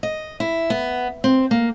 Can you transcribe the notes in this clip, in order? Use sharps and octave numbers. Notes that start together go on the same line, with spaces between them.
D#5
E4
B3
C4
A#3